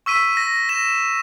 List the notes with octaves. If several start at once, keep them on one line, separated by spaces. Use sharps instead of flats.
C#6 E6 B6 D#7
A#6
A#6 E7